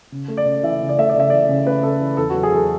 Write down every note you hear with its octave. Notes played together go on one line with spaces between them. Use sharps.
C#3
A3
D5
C#3
E3 E5
C#3
D5
A3 E5
D5
C#3 E5
E3 D5
C#3
A3 B4
C#3 A4
E3
E2 A4
F#3 F#4
G#4
E2 A4